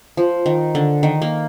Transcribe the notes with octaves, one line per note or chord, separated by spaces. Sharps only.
F3
D#3
D3
D#3
A#3